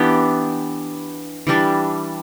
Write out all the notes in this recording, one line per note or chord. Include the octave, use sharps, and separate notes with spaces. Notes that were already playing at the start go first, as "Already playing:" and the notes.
Already playing: E3 B3 D4 G4
E3 G3 D4